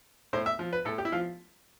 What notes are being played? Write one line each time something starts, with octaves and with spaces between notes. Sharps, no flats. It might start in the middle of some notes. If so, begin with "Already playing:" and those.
A2 C5
E5
F3
B4
A2 A4
G4
E4
F3 F4